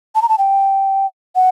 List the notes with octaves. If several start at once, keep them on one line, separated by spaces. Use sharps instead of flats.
A5
A#5
A5
G5
F#5